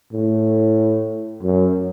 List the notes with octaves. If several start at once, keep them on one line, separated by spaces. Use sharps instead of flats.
A2
F#2